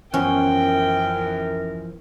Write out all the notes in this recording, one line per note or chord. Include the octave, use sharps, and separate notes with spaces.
F#2 E3 F3 B3 C#4 A#4 B4 G5